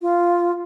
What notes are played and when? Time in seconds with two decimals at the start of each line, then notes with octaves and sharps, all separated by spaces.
0.02 F4